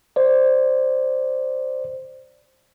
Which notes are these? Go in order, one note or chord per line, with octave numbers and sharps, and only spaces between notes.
C5 D5